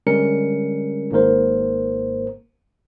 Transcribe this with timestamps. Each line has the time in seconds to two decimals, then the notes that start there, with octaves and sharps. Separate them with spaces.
0.07 D3 G3 G#3 C#4 A#4 C#7
1.11 G#1 G#2 A#3 A#4 C5